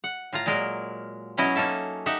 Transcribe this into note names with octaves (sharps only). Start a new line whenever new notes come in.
F#5
A2 F4 A#5
A#2 F#3 G#3 A#4
B2 F#3 C#4 E4 D#5
A#3 C#4 D#4 A4 E5
D#4 G4 E5 F#5